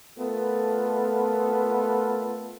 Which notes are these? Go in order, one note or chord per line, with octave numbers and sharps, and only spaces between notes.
A3 B3 F4 A4 A#4